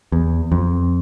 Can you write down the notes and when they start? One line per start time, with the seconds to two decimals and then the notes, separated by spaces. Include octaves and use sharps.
0.12 E2
0.52 F2